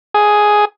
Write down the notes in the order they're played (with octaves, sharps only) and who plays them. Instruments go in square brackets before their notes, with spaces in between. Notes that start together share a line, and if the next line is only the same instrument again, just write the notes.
[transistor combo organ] G#4